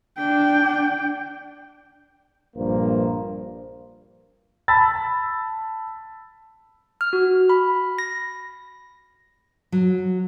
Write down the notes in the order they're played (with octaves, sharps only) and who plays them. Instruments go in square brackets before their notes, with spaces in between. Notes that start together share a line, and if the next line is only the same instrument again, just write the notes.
[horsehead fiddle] D4 G5
[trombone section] A#1 G2 A#3 C5
[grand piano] A5 B5 E6 A6
[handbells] F6
F#4
B5
A#6
[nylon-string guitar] F#3